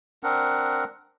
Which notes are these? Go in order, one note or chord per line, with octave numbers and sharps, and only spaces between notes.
C4 D4 A#4 F#5